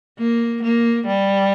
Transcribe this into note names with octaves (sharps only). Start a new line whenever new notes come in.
A#3
A#3
G3